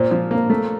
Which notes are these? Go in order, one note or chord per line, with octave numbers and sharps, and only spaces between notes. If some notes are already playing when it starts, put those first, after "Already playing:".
Already playing: A#2 C5
F3
A#3
A3